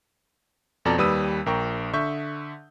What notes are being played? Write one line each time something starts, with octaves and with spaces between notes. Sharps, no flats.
F2 B2 A4 D5 A#5
D#2 G3 B4 D#6 E6 D#7
A#1 A#4 G5 C#6
D3 E5 C#6 G6